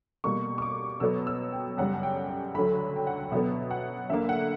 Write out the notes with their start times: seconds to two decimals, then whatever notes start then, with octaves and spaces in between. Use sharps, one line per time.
0.24 B2 G3 A#3 C#6
0.58 C#6
0.62 D6
1.00 B2 F#3 B3 E6
1.27 E6
1.53 G5
1.78 F#2 C#3 G3 F#5
1.94 F#5
2.03 G5
2.29 G5
2.54 D2 D3 F#3 B5
2.96 G5
3.07 F#5
3.32 B2 F#3 B3 E5
3.71 F#5
4.10 D2 D3 A#3 E5
4.29 F#5